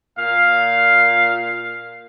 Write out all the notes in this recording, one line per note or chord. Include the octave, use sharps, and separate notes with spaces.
A#2 F5